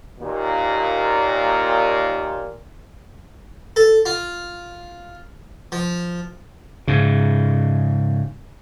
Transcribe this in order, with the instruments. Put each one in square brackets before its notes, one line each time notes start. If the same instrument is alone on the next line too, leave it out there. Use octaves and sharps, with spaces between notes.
[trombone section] D#2 A#2
[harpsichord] A4
F4
F3
[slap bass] G#2 C#3